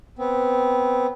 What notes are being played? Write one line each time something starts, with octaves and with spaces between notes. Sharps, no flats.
B3 C4